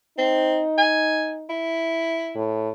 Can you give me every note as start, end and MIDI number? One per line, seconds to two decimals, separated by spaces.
0.18 0.62 60
0.18 1.56 63
0.78 1.31 80
1.49 2.48 64
2.35 2.70 45